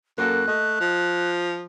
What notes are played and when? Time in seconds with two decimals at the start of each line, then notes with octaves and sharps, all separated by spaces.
0.18 F#2 A#3 F#4 A4 F#6
0.47 A3 D#5
0.81 F3